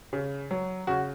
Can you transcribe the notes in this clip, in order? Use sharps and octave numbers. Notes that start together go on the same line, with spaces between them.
C#3
F#3
C#3 F#4